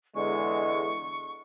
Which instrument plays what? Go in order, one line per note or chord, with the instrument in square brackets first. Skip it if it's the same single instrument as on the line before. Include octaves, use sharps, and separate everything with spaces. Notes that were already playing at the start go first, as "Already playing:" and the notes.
[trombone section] E2 D3 G#3 [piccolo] C#6